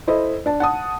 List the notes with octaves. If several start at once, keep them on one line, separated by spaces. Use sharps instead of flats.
E4 A4 C5 D#5
D4 A5
F#5 A5 D#6